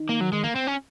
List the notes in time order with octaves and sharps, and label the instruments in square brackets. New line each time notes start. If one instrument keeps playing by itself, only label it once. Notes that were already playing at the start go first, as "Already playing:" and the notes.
Already playing: [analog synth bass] D#3
[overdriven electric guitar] A#3
F#3
G#3
A#3
C4
C#4